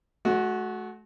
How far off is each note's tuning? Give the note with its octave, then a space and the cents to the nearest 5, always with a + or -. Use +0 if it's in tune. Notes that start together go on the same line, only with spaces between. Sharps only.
A3 -40 F#4 +0